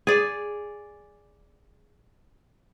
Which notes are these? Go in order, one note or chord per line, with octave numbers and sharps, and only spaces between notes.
G#4 D5